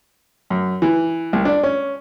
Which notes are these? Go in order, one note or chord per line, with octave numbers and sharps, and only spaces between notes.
F#2
E3
C2
D4
C#4